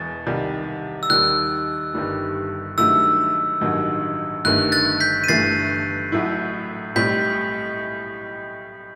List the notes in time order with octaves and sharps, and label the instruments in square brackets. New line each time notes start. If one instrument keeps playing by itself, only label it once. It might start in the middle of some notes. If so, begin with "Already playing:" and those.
Already playing: [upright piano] E1 E2 B2 [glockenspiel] A6
[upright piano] C2 C3 D#3 G3
[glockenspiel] E6
[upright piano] D#2 D#3 G3 [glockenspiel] F#6
[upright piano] G1 G2 D#3 G3
[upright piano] G2 D#3 F#3 A3 E4 [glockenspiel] E6
[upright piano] A1 G2 D#3 F#3
[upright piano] G1 G2 D#3 A3 [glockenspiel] F#6
[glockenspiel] F#6 A6
G6 B6
D#7
[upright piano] G1 G2 E3 A3 [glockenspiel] A6 C7
[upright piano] A1 A2 F#3 A3 E4
[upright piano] B1 A2 G3 C4 [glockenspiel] G6 B6